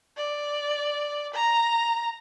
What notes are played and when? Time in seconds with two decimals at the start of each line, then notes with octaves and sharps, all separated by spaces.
0.17 D5
1.34 A#5